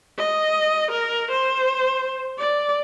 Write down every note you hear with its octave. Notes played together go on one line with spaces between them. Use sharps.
D#5
A#4
C5
D5